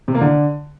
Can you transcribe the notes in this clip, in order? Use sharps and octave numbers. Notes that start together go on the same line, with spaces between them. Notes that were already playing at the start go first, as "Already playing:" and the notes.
C3
A#3
D3